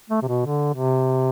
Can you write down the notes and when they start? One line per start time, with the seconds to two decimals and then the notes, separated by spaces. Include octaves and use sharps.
0.10 A3
0.22 C3
0.28 B2
0.46 D3
0.74 C3